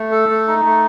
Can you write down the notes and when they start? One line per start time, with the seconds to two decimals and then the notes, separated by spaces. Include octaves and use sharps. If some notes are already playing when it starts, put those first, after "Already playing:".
Already playing: A3
0.11 A4
0.29 A3
0.48 D#4
0.65 A3